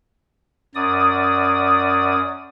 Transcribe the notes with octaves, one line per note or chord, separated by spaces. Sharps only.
F#2 D5 D#6